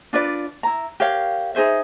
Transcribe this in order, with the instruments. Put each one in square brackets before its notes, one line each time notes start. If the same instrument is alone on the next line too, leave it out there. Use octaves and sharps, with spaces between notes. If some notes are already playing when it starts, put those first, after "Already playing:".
[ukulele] D4 F4 B4 D5
E4 A#5
G4 A#4 C#5 F5
D#4 G#4 C5 E5